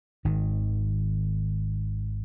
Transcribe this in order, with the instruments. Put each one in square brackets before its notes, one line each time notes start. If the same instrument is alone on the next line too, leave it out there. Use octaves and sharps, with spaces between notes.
[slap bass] G#1 D#3